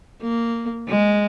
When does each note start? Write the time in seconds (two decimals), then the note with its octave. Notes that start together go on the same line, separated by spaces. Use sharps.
0.22 A#3
0.88 G#3